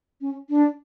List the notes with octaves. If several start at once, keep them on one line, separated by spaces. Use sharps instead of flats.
C#4
D4